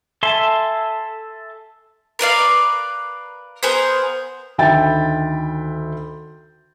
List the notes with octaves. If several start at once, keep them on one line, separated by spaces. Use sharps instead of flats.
A4 E5 G#5 A5 C6
A#4 B4 D5 F5
B3 G#4 A#4 C5
D2 D#3 E5 G5 B5 A6